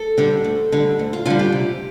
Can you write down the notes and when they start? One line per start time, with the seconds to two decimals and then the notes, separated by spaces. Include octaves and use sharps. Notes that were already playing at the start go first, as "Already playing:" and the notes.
Already playing: A4
0.18 D3 G3
0.44 D2
0.72 D3 G3
0.99 D2
1.13 F4
1.26 D3 G3 F4
1.39 G4
1.52 C3